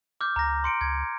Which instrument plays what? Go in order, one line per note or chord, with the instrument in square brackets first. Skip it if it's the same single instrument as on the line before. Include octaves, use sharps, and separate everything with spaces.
[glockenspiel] D6 F6 G6
[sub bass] C#2 [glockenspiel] A#5 A#6
[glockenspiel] C6 C#7 D7
[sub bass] C#2 [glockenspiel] G#6